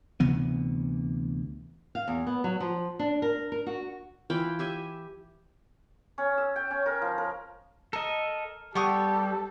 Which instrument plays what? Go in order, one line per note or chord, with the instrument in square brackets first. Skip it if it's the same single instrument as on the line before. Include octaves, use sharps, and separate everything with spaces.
[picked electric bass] D2 C3 E3 B3
[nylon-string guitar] F5
E2
B3
F#3
F3
D4
A#4
A#4
F#4
[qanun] E3 F4 G5 B5
G4 E5 G#5
[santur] C#4
E6
G5
C#4
A#4
F3
A#4
[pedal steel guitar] A4 D#5 [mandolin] A#4
[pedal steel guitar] G3 [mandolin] B3 C#6 D#6 [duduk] G4 [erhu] A4